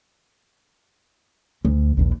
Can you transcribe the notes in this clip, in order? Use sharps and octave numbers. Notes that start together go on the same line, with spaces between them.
D2
A#1 D#2